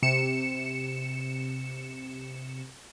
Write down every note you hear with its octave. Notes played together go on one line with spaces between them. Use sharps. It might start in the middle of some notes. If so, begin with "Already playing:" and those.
C3 C#7 E7